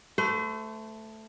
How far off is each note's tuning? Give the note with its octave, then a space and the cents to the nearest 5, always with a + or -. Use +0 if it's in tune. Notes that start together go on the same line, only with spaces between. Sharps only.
A3 +0 C5 -40